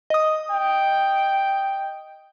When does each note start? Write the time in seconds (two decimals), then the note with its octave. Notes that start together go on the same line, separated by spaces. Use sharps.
0.10 D#5 D#6
0.51 G5